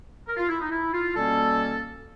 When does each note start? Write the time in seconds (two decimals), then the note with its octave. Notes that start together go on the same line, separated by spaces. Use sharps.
0.27 A#4
0.37 F4
0.49 E4
0.60 D#4
0.70 E4
0.93 F4
1.15 B2 G3 A#3 C#4 A4